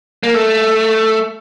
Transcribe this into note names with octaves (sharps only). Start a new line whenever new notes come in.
A#3
A3